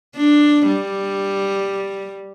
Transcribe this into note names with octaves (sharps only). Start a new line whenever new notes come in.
D4
G3